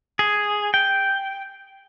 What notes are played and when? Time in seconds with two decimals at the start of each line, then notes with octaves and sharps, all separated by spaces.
0.19 G#4
0.74 G5